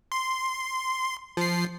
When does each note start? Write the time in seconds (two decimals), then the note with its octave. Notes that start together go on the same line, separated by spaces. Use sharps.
0.12 C6
1.37 F3 C7